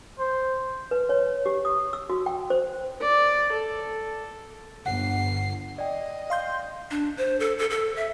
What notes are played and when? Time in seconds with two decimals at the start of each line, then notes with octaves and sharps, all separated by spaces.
0.19 C5
0.91 B4
1.09 C#5
1.46 G4
1.65 D#6
1.93 E6
2.10 F#4
2.26 G5
2.50 C5
3.01 D5
3.52 A4
4.86 G1 F#5 C7
5.78 D5 D#5 G5
6.30 F5 C6 G6
6.91 D4
7.17 C5
7.40 A4
7.59 A4
7.70 A4
7.96 E5